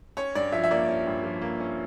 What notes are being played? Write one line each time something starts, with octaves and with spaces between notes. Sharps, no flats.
C#4 C#5
G2 D5
F3 E5
E5
A#3 D5
C#4
G2
F3
A#3
C#4